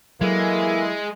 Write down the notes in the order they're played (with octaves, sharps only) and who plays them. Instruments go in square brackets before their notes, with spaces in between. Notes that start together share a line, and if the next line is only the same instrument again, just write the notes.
[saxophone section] E3 A#3 A4 [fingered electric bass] F#3 [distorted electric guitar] G#3 [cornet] E4